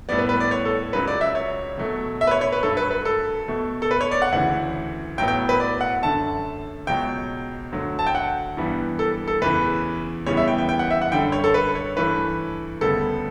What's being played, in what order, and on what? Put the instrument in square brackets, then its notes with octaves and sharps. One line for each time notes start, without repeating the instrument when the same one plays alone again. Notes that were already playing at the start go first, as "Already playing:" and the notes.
[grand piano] A2 G3 B3 D5
B4
B4
D5
C#5
A4
C#2 C#3 F#3 B4
D5
E5
C#5
B2 F#3 A3
E5
B4
C#5
C#5
B4
G2 F#3 A3 A4
B4
B4
A4
B2 A3
A4
B4
C#5
D5
F#5
D2 C#3 E3 F#5
A2 F#3 B3 G5
G5
B4
D5
F#5
F#2 D3 A3 A5
C#2 B2 F#3 G5
D2 D3 F#3
A5
G5
F#5
G2 E3 G3 B3
A4
A4
E2 C#3 E3 B4
E2 C#3 E3 G3 B3 C#5
E5
G5
G5
G5
F#5
E5
F#5
F#2 D3 G3 G5
C#5
A4
B4
C#5
G2 E3 A3 B4
D2 C#3 G3 B3 A4